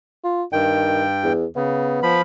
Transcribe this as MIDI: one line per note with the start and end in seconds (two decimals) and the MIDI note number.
0.24 0.43 65
0.53 1.33 43
0.53 1.03 51
0.53 1.33 79
1.24 1.45 40
1.56 2.00 49
1.56 2.19 59
2.03 2.22 53
2.03 2.22 83